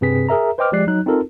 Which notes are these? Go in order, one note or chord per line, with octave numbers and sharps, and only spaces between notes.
G2 C3 C4 G#4 B4 B6
G#4 A#4 E5 A#5
B4 C5 D#5 G5 D6 F6
F3 G#3 G4 D5 F#6 C7
F#3 D#4 F#6
C4 D#4 F4 A4 A#4